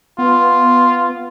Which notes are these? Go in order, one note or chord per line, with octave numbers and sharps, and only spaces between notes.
B3 F4